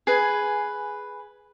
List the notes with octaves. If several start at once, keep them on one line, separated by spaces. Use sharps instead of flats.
G#4 B4 G#5